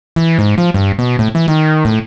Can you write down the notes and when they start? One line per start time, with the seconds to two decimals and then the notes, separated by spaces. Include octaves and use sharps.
0.16 E3
0.39 G#2
0.58 F3
0.74 G2
0.99 B2
1.19 A2
1.35 E3
1.48 D#3
1.85 A2